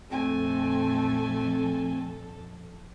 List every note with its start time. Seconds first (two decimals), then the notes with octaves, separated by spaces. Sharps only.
0.10 A#1 F2 A3 C4 A4 G#5